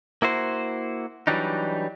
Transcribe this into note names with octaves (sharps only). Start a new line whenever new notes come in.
A#3 E4 F#4 C5
E3 F#3 G3 D4 D#4